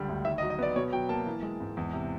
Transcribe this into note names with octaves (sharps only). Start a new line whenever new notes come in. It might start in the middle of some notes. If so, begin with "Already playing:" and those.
Already playing: C#2 D3 G3
D2
D#3 E5
D#5
F#3
D#5
B3 D5
B2 C#5
F#3 G5
A#3 A5
E3
G#3
G#2
E2
C3